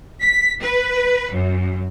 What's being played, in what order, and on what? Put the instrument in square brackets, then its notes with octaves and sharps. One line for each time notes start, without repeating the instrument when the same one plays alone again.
[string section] B6
B4
F#2